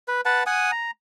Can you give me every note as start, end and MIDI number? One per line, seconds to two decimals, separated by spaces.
0.08 0.21 71
0.25 0.43 71
0.25 0.43 78
0.25 0.43 81
0.46 0.71 78
0.46 0.71 80
0.46 0.71 87
0.72 0.91 82